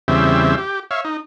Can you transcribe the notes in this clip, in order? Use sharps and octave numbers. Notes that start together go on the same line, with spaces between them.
E2 C#3 G3 C4 E5
G4
C#5 E5 F5
D#4